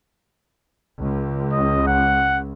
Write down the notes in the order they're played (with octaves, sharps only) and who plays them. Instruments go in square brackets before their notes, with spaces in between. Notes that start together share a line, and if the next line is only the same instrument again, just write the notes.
[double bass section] C#2
[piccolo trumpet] D#5
F#5